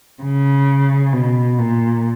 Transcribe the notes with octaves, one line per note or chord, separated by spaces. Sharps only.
C#3
B2
A#2